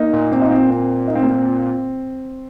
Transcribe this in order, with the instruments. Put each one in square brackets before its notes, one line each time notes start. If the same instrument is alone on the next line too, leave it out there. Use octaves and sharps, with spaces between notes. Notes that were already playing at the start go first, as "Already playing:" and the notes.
Already playing: [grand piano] A#3 D#4
[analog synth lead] A#2
[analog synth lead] A#2 [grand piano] C4
[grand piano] D#4
C4
C4
D#4
C4
A#3
C4